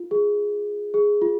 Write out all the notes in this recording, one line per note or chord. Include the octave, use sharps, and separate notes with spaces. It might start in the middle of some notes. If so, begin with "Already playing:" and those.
Already playing: F4
G#4
G#4
F4